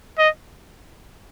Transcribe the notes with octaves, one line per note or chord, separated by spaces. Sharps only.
D#5